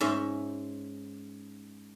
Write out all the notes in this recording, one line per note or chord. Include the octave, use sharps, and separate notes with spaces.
G#2 C#4 E5